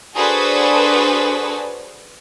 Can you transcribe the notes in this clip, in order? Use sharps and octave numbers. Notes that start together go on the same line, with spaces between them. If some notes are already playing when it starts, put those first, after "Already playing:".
D4 F#4 G#4 A4 B4 C5